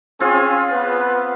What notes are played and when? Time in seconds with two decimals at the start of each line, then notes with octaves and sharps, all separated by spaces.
0.20 C4 C#4 F4 G#4
0.71 B3 B4